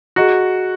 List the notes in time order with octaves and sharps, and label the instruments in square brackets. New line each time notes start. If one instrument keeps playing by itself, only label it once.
[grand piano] F#4 [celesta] G#4 D#5 A#5